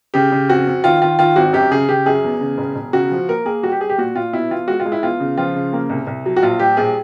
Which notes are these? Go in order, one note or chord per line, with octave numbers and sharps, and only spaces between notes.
C#3 G4
C#3
F2 F#4
F2
D#3 F4
D#3 F4
D#3 F4
G#1 F#4
F#2 G4
C#3 G#4
C#3 G4
F#2 G#4
E2
C#3
E1
E1
C#3 F#4
F3
A#3 A#4
A#3 G#4
G3 F#4
G4
G3 G#4
G4
A#2 F#4
A#2 F4
B2 E4
E2 F4
G#3 F#4
F4
G#3
E4
E2 F4
C#3
F3 F4
C#3
A#3
C2
C2
F#3
F#4
A#1 F4
G3 G4
A#1 G#4